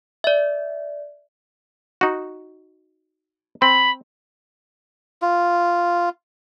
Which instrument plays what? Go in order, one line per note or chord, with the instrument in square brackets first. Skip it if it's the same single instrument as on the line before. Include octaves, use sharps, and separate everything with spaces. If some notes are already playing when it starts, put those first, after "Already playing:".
[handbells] D5 E5
[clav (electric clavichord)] D#4 F#4
[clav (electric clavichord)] C4 [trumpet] B5
[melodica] F4